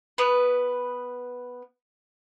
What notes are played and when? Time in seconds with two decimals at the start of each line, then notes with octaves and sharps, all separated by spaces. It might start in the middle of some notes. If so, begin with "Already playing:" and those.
0.18 B3 B4